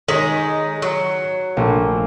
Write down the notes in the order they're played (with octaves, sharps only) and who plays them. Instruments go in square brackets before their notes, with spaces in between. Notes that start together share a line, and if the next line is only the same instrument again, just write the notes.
[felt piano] D#3 C#5 B6 [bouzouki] G#3 D#4
[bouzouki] F#3
[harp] A#1 [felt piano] A3 A#3